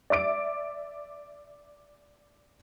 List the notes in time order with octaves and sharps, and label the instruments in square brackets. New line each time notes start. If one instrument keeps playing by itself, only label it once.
[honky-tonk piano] D5 E5 D6 D7